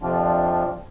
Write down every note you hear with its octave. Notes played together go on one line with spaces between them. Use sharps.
F2 C3 F3 C4 D4 F4